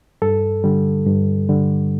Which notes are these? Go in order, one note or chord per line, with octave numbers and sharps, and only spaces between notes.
G2 A4
D3 G3
G2
D3 G3